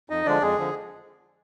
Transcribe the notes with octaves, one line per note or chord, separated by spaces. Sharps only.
F2 D#4 D#5
D3 F3 G#3 D4 D5
F2 G#3 G#4
D3 F3